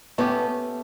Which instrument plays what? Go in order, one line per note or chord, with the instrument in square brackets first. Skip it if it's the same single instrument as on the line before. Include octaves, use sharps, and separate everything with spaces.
[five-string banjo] A3 C#4 G4 [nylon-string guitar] B3